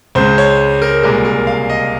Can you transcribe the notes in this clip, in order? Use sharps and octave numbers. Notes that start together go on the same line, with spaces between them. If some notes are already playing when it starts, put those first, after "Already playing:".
C#2 C#3 G#3 C5
C#5
A#4
C2 A#2 G#3 A#4
A#4
F5
D#5